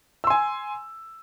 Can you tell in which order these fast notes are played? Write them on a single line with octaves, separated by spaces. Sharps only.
E6 C6 G#5